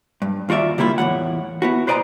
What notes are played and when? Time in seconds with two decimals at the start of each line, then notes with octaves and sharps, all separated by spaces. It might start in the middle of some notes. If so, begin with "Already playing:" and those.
0.22 G2
0.49 D#2 F4 F#4 D5 E5
0.78 D3 G3 A#3 E4 F4
0.98 E2 A2 F3 F#5
1.62 B3 E4 F#4
1.87 B4 C5 D5 D#5 A5 A#5